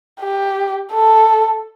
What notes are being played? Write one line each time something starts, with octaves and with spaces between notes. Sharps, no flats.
G4
A4